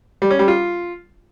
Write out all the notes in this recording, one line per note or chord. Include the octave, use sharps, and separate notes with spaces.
G3
C#4
G3
F4